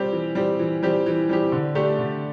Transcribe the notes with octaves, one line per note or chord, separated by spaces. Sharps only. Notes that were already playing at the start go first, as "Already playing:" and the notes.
Already playing: G3 C4 G4
E3
G3 C4 G4
E3
G3 C4 G4
E3
G3 C4 G4
D3
A3 D4 G4
D3